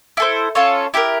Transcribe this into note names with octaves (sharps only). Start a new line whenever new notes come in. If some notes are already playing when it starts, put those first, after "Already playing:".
E4 A4 C5
C#4 F4 A4 C#5
E4 G4 A#4